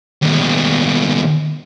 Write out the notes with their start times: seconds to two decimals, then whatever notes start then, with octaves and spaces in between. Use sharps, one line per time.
0.22 D#2 B2